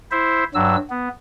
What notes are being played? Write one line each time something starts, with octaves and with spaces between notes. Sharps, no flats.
E4 C5 E5
G2 F#3 E6
B3